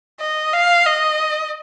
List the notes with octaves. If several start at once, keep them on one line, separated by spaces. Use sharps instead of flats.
D#5
F5
D#5